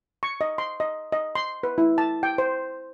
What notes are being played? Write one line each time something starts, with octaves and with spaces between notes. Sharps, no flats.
C#6
D#5
C6
D#5
D#5
C6
B4
E4
A5
G5
C5